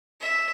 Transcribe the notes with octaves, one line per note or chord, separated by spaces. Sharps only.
E5